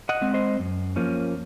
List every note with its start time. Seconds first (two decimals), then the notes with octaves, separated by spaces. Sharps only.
0.09 D#5 F#5
0.21 G#3 C4
0.34 C5 D#5
0.59 F#2
0.96 F3 A#3 C#4